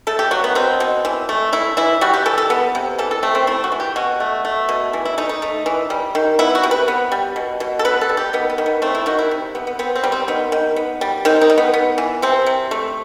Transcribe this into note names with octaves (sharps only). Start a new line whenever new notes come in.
A3 A4
G4
F#3 F#4
B3
B2 C4
B2
E3
A3
A3 E4
E3 E4
G3 F#4
G4
E3 A4
A4
B3
C3
E3 A4
A4
A3 C4
C4
A3 E4
F#4
E3
G4
B2 F#4
A3
A3
B2
E3
E4
A3 D#4
D#4
A3
E3
G3
D#3
B3 E4
F#4
C3
B4
B3
G3
B2
B2
A4
B3 B4
A4
G3
G4
D#3 B3
B3
D#3
B3
A3 C4
E4
D#3 F#4
E4
C3
C3 B3
B3
B3 C4
C4
G3
C4
D#3 B3
D#3
B3
G3
D#3 C4
D#4
D#3
B3
B3
E3
C3 C4
C3
A3